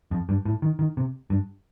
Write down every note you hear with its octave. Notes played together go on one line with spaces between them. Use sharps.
F2
G2
A2
D#3
D#3
C3
G2